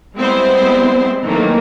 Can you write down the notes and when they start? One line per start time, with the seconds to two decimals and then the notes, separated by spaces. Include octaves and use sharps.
0.17 G3 G#3 B3 C4 E4 C5
1.26 D#3 E3 F#3 A3 A#3